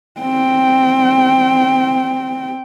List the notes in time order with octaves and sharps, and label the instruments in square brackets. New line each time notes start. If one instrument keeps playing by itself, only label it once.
[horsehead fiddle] C4 G5